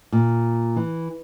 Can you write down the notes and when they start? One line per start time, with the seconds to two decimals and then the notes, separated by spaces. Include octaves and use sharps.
0.13 A#2
0.76 E3